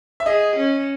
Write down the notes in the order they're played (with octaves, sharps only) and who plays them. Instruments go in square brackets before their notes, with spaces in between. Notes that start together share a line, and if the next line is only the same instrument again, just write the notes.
[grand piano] E5
[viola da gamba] G#4 [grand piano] D#5
[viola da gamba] C#4